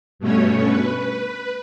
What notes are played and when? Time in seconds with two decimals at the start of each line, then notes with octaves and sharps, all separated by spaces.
0.19 G2 B2 A3 C#4 C#5
0.67 B4